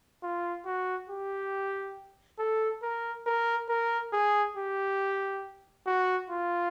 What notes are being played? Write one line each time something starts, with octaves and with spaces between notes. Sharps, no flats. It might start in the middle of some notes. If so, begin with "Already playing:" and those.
F4
F#4
G4
A4
A#4
A#4
A#4
G#4
G4
F#4
F4